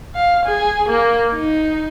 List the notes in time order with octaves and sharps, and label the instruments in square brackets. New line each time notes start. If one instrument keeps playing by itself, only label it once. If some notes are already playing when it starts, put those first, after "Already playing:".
[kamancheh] F5
G#4
A#3
D#4